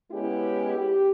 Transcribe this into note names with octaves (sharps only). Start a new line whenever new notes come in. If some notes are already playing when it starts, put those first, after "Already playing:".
G#3 B3 C#4 E4 G4 G#4
G4